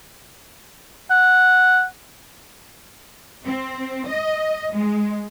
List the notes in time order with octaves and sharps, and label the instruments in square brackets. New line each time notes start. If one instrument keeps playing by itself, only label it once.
[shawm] F#5
[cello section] C4
D#5
G#3